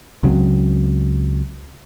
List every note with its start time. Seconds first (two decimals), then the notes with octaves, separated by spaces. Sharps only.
0.23 C#2 C#3 F#3 C4